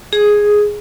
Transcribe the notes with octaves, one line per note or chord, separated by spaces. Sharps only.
G#4